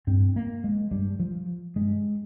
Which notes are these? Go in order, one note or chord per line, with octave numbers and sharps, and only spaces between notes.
G2 C4
A#3
G#3
G2 G3
F3
G2 G#3